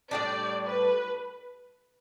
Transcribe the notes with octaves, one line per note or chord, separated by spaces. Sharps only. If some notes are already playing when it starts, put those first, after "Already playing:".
A2 G3 D4 D5
B4